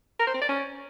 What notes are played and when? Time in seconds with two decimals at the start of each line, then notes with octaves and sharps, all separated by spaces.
0.20 A#4
0.27 C5
0.34 C4
0.42 D5
0.49 C#4